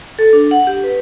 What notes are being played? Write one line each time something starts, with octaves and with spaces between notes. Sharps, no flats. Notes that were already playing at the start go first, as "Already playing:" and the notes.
A4
D4
F#5
G4
B4